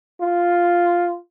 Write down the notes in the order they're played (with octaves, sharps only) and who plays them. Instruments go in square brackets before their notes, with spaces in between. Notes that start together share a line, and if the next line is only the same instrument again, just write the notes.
[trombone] F4